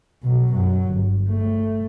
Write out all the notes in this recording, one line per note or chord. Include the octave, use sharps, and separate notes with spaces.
B2 F#3
F#2 F#3
G1
A3